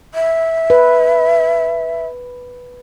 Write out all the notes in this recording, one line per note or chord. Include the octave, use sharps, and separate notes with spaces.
E5
B4